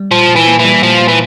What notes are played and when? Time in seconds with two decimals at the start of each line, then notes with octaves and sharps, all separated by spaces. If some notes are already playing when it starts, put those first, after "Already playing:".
Already playing: G3
0.11 A#2 F3
0.29 A#2
0.36 E3
0.48 A#3
0.59 E3
0.64 G3
0.82 A#2 F3
1.01 A#2
1.08 E3